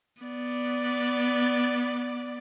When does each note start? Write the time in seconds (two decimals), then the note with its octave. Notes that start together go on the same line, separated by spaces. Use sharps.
0.23 B3 D5